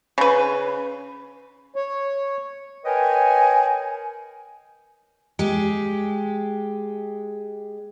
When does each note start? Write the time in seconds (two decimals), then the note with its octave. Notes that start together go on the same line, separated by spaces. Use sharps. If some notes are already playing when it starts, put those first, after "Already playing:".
0.18 C#3 B4
1.76 C#5
2.85 A#4 B4 C#5 D#5 G5 G#5
5.39 G#3 G4